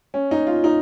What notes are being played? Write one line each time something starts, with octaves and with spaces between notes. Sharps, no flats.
C#4
D#4
F4
D#4